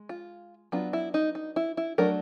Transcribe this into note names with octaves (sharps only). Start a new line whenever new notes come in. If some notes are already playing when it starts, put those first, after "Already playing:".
Already playing: G#3
F4
F#3 B3 D4 F4
E4
D#4
D#4
E4
E4
F#3 A3 D4 A#4